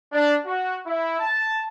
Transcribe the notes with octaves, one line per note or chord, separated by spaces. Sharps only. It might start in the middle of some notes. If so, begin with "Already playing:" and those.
D4
F#4
E4
A5